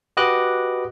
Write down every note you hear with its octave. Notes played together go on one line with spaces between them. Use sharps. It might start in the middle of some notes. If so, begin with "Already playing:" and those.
F#4 G4 B4 D#5 D6 F#6